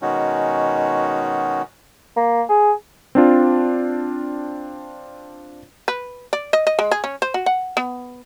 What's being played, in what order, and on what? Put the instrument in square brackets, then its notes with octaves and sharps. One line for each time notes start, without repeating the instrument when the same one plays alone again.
[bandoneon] B2 D#3 G#3 C#4 D#4 F#4
[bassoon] A#3
G#4
[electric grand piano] C4 D4 F4
[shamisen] B4
D5
D#5
D#5
G#3
G#4
C#4
C5
F#4
F#5
B3